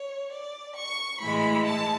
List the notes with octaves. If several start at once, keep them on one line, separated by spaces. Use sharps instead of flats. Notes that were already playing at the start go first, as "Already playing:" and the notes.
Already playing: C#5
D5
C#6
A2 E3 G#3 B5
A5